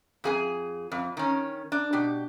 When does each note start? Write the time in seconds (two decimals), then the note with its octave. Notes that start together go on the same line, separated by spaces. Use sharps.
0.24 F2 G#4 G#5
0.92 F2
1.17 D#3 C#4
1.72 D4
1.93 B2 G4